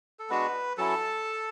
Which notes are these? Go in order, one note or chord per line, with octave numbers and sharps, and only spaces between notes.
A4
G#3 B3 D4 F#4 B4
F#3 C#4 E4 A4 A5